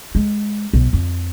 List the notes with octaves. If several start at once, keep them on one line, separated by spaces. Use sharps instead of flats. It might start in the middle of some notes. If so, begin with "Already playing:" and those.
G#3
B1
F2